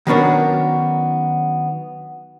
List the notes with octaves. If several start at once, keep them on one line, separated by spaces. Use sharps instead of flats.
D#3 F#3 B3 C#4 D4 A#4